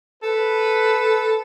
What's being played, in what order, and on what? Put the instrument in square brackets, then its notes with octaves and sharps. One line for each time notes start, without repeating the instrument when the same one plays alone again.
[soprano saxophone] A4 [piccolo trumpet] B4